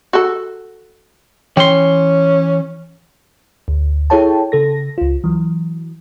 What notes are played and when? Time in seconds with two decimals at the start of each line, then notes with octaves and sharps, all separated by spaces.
0.13 F#4 A4
1.57 E3 C#4 G5 C6
3.68 D2
4.10 E4 G#4 A4 C#5 G5 A5
4.52 C#3 A4 A#6
4.98 C#2 F4
5.24 E3 F#3